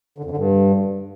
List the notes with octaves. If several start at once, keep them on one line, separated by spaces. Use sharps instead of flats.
D3
F2
D3
G2